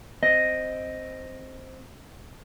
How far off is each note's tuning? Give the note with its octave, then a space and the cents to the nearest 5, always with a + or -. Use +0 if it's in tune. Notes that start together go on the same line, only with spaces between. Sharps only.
C4 +0 D#5 +0